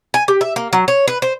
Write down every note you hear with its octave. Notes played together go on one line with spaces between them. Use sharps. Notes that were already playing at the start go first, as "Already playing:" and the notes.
G#5
G4
E5
A#3
F#3
C#5
B4
C5